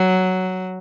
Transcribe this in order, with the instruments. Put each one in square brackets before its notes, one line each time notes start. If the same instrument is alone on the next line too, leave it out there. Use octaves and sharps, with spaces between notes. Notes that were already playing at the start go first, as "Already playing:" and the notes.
Already playing: [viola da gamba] F#3